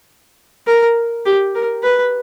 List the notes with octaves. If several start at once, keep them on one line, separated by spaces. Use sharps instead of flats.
A#4
G4
A#4
B4